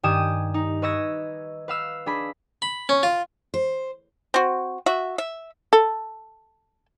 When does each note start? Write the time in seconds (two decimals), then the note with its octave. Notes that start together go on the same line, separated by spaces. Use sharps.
0.03 G2 D#3 G4 G#5 D#6 E7
0.54 D#4
0.82 B4 D#5 C#6 E6 G#6 A#6
1.68 B4 F5 E6
2.06 D4 G#4 B5
2.62 B5
2.89 C#4
3.03 F4
3.54 C5
4.34 C4 F#4
4.86 F#4 E5
5.18 E5
5.73 A4